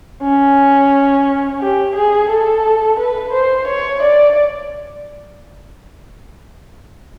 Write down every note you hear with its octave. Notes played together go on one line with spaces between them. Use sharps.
C#4
G4
G#4
A4
B4
C5
C#5
D5